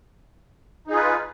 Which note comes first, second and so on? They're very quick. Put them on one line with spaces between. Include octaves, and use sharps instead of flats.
D#4 G#4 F4 B4